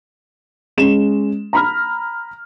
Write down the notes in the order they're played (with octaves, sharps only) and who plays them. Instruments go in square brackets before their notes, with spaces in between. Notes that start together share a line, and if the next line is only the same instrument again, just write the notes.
[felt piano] G#3 C#4 E7
A#5 B5 F6